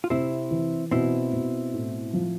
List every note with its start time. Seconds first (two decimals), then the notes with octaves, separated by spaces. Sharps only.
0.04 F4
0.10 C3 C4 E4
0.51 E3
0.91 B2 C4 E4
1.33 B2
1.74 A2
2.13 F3